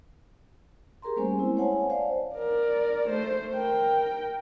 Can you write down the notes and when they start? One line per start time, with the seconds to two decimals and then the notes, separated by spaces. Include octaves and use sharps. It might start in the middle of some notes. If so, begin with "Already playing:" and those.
1.02 G4 G#4 A#4 A#5 C6
1.16 G3 A3 A#3 C#4 C5 G#5
1.38 G#3 C4 E4
1.57 C5 C#5 F#5 G#5 A5
1.90 C5 D5 F5
2.36 A#4 D5
3.09 A3 C5
3.54 A#4 G5